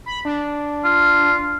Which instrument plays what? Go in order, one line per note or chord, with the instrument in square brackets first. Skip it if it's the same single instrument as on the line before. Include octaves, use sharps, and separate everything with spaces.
[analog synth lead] B5
D4
[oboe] F4